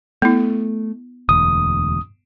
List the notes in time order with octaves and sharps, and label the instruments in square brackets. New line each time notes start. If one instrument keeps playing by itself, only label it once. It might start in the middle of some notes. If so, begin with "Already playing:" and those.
[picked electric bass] A3 [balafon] B3 E4
[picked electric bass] E1 D2 [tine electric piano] D#6